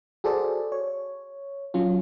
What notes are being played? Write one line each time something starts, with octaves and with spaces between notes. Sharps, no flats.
F#4 G#4 A4 C5 D5
C#5
F#3 C#4 F4